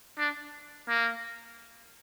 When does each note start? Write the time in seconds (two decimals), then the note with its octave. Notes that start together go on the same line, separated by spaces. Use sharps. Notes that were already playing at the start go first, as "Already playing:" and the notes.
0.18 D4
0.89 A#3